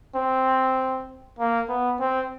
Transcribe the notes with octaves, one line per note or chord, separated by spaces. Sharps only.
C4
A#3
B3
C4